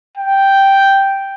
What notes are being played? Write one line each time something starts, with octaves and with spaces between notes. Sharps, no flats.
G5